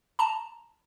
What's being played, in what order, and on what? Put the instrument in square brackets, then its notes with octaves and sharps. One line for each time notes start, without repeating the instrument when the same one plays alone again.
[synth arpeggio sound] A5 A#5